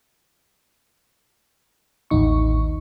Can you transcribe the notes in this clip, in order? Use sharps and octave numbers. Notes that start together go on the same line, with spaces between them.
A1 D#2 D#4 C#6